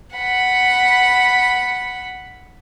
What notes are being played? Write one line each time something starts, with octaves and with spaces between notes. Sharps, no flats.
F#5 B5